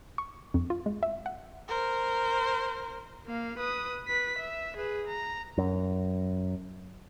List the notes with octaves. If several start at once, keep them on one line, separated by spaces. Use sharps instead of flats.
C#6
F2
F4
G#3
E5
F#5
A#4 C5
A#3 F5
B4 D#6
B4 B6
E5
G#4 B4
A#5
F#2